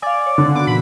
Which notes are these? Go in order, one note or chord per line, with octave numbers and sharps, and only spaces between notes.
D5 F5 G#5
C#5
D3
B3 D4 F#4 D6
A#2 C#3 E3 B5